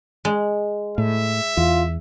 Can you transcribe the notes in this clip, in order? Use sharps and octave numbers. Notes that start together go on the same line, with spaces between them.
G#3
A2 E5
E2 F4